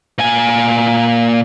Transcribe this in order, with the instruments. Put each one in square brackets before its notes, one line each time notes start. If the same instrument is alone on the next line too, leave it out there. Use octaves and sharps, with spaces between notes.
[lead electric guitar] A#2 G#5